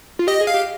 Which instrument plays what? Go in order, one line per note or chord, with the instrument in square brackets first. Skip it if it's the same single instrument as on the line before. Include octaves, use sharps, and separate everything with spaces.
[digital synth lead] F4
[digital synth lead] G4 [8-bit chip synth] D#5
[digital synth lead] G#4
[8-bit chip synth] F5
[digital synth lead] G4